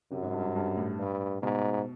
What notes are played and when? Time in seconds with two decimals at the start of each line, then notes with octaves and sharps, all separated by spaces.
0.11 F#2 C3
0.22 G#2
0.33 G2
0.44 G2
0.55 G2
0.77 A2
0.99 G2
1.42 G#2 B2